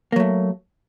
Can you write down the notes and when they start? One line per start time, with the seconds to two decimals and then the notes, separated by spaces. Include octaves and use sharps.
0.12 A#3
0.16 F#3
0.20 A3